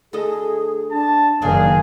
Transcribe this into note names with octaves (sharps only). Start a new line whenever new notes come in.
D2 G#4 A4 D#5
D4 A5
F#1 D#3 D4 G#4 D5 F5